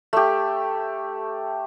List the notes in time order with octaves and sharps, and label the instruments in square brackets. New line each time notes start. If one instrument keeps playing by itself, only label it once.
[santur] A3 G4